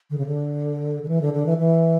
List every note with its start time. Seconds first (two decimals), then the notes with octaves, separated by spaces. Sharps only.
0.10 D3
0.17 C#3
0.26 D3
1.02 D3
1.08 E3
1.21 D3
1.33 D3
1.46 E3
1.58 E3